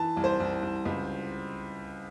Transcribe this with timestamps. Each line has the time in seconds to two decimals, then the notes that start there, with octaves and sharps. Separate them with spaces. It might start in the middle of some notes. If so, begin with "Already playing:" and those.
Already playing: E3 A5
0.17 C2
0.24 C5
0.40 C2
0.62 C2
0.85 C#2